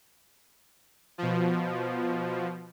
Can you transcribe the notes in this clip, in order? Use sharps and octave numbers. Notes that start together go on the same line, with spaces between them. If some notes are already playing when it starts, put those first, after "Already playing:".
B2 F3